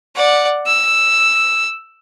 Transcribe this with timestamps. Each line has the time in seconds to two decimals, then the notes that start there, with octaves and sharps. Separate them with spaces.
0.15 D5 F#5
0.66 E6